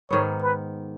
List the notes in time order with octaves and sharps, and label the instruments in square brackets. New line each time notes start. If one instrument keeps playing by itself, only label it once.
[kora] G#2 D#3 B3 [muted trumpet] C#5
[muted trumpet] B4